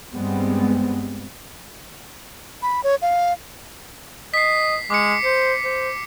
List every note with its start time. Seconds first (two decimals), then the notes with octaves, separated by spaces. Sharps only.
0.13 G2 G3 G#3 B3 C4
2.62 B5
2.84 C#5
3.02 F5
4.34 D#5 B6 C7
4.90 G#3 D6 C#7
5.24 C5 C#7
5.64 C5